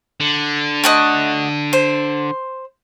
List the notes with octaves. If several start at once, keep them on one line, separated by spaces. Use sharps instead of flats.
D3
A3 F#4 D#5
C5